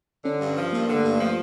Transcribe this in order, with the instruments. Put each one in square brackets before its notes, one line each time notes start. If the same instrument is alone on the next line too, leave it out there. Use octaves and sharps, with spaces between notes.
[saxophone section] D3 [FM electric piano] C#4
[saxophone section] G2
F3
[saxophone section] G2 [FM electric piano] A#3
[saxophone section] D3
[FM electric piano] A3
[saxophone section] G2
[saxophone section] F3 [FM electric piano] A3